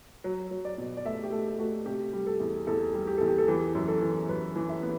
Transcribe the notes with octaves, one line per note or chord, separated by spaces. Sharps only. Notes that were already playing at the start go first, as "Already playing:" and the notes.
F#3
F#3
D5
B2
D5
A3 E5
G4
A3 A4
A3 F#4
C3 G4
G3
A4
E2
E2 A4
G3
G4
E2 A4
G4
A4
E3 G4
F#2
A4
E3
F#2 B4
E3
E5
B3